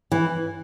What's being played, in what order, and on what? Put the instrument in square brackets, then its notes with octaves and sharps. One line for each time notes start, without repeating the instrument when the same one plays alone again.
[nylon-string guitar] E3